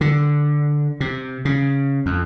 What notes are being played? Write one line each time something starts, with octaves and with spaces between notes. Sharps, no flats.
D3
C3
C#3
F2